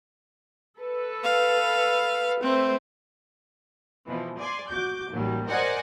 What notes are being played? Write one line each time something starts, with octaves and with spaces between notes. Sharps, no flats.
A4 B4
F5
A3 C4 B4 C5
B2 E3 F3
D5 G#5 C6
F#4 D6 G6
A1 D#2 F#3 G3
A#4 C5 D5 D#5 F#5 G#5